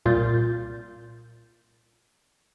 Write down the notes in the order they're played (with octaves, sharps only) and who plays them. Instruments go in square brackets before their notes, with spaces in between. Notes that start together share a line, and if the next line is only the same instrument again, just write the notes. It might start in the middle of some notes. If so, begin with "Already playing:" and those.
[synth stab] C2 A#2 F4 G6 A6